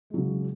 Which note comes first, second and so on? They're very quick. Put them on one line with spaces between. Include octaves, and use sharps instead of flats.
G#3 F#3 C#3